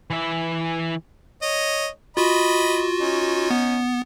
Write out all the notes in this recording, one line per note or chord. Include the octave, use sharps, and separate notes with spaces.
E3 E5
C#5 D#5
F4 F#4 D#5 B5
C#4 D#4
B3